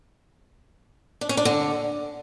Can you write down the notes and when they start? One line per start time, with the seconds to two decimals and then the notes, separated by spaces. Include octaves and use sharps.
1.21 D4
1.29 C#4
1.37 D4
1.45 D3